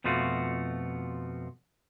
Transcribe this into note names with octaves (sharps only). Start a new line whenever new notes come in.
F2 B2 F3 A3 F4 F#4